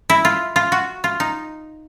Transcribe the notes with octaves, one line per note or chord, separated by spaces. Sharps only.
E4
F4
F4
F#4
F4
D#4